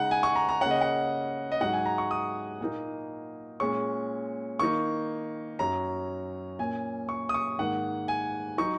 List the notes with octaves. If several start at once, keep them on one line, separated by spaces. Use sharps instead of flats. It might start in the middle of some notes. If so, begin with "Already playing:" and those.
Already playing: C#3 G#3 D#4 F#5
G#5
C#6
A#5
A#5
C#3 A#3 C#4 F#5
D#5
F#5
D#5
G#2 F#3 D#4 F#5
G#5
A#5
C#6
D#6
A#2 A#3 D#4
A#2 G#3 C#4 C#6
D#3 A#3 D#4 C#6
F#2 F#3 C#4 A#5
A#2 A#3 C#4 G#5
C#6
D#6
C#6
G#2 D#3 A#3 F#5
G#5
F#3 D#4 C#6